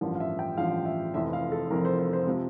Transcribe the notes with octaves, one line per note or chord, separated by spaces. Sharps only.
A1 G2 F3 A#4
F5
E5
G5
A1 G2 F3 F5
E5
F1 F2 E3 E5
F5
A4
F1 F2 E3 A#4
C5
C5
C5
C3 F3